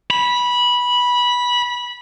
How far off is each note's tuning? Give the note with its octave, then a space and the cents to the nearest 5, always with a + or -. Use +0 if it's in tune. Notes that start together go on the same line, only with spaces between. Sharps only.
B5 -15